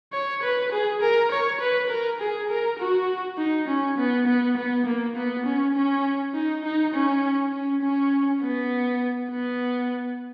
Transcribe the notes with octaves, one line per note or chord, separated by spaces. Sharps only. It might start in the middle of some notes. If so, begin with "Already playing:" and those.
C#5
B4
G#4
A#4
C#5
B4
A#4
G#4
A#4
F#4
D#4
C#4
B3
B3
B3
A#3
B3
C#4
C#4
D#4
D#4
C#4
C#4
C#4
B3
B3